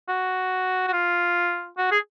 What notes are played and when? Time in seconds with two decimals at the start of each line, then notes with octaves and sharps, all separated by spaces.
0.08 F#4
0.88 F#4
0.92 F4
1.77 F#4
1.91 G#4